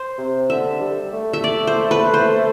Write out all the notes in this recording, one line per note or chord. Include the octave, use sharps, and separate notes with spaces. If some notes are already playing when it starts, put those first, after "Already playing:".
Already playing: C5
C3
D3 E5
G3
A3
E5
D5
C5
B4
C5